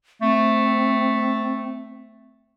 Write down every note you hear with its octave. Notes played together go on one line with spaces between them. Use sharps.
A3 C4